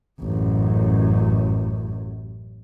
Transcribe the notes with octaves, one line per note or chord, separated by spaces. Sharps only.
A1 F#2